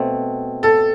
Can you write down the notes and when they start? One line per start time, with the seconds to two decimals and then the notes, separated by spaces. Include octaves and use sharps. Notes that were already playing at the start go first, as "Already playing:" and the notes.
Already playing: B2 A3 C4
0.63 A4